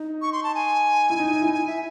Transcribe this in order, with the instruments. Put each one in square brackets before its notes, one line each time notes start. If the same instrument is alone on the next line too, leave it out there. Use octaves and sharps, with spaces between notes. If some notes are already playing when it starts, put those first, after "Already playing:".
Already playing: [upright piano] D#4
[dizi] C#6
C6
A5
G#5
[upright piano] E4
D#4
D#4
E4
[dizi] G#5
E5